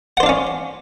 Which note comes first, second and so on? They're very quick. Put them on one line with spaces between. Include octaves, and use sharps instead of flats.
F#5 C5 D4 F5 C#4